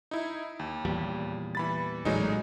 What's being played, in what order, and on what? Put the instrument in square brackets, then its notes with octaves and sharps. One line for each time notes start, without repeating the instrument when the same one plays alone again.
[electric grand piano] D#4 E4
D#2
[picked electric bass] E2 A#2 G3
[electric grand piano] E3 B5 A6
[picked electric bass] A1 A#2 [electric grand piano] F#3 G#3 D#4